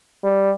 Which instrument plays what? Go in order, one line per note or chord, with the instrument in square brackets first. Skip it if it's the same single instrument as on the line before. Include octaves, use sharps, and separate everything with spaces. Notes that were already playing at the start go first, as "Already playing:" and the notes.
[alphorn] G3